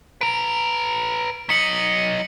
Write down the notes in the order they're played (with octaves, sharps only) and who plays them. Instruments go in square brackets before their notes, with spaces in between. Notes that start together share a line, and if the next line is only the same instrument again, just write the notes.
[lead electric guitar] B4 A#5 [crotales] D7
[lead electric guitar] F#3 D#5 [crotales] B6 C#7 F#7